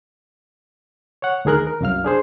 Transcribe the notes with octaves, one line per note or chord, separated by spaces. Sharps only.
C#5 F#5
D2 D#3 G#4 A#4 F#6
A#4
C2 F#2 F5 F6
D4 G#4 C5